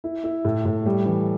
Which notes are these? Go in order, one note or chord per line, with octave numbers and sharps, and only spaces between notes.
E4
E4
A2
A2
G3
E3